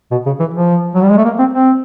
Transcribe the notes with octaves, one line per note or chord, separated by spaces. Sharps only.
B2
C#3
E3
F3
F#3
G3
G#3
A3
A#3
C4
C4